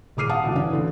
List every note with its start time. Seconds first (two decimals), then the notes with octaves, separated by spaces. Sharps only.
0.17 D#1 G#4 D6 F6 C7 D#7
0.29 F5 F#5 A5 D#6
0.44 G1 C#2 B2 E3
0.55 E3 C#4 D4
0.72 D2 D3 E3